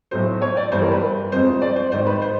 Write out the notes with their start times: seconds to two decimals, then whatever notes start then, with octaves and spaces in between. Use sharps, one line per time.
0.11 B1 A2 F#3 C5
0.42 C#5
0.57 D5
0.72 G1 G2 E3 G3 C5
0.82 A#4
0.92 B4
1.32 G1 F2 C3 F3 G#3 C5
1.62 D5
1.76 C5
1.92 G#1 G#2 D#3 C5
2.07 B4
2.22 C5